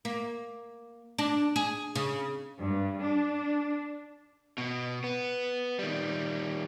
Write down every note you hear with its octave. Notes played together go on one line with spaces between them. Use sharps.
A#3
D4
G#4
C#3
G2
D4
B2
B3
D#3 G3